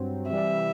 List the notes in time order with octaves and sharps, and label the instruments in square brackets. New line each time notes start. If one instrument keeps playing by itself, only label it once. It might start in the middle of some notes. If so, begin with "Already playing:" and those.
Already playing: [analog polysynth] G2 F#3 C4
[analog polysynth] C3 E3 G3 [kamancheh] E5